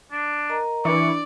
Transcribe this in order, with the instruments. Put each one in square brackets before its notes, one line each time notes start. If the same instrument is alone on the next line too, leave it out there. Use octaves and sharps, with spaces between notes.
[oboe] D4
[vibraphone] A#4 D#5 A#5
[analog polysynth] E3 [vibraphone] D4 [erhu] D5 [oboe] C#6